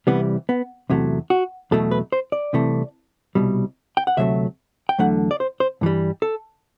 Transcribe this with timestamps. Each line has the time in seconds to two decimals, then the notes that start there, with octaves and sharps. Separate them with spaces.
0.07 C2 C3 E3 G3 B3
0.49 B3
0.90 E2 C3 F#3 A3
1.30 F#4
1.71 E2 B2 F#3 A3 A4
1.91 B4
2.12 C5
2.32 D5
2.53 C2 C3 E3 A3
3.35 C2 B2 G3
3.97 G5
4.07 F#5
4.17 D2 C3 F#3 A3 E5
4.89 G5
4.99 E2 D3 F#3 A3 F#5
5.31 D5
5.40 C5
5.60 C5
5.81 G2 E3 G3
6.22 A4